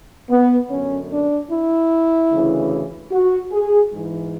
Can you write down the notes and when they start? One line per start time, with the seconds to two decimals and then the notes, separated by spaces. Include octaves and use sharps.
0.30 B3
0.70 F#2 D3 C#4
1.10 D4
1.50 E4
2.31 D2 C#3 E3
3.11 F#4
3.52 G#4
3.92 G#2 E3